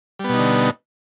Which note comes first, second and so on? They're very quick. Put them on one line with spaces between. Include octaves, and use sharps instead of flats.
G3 B3 B2 D#4 D3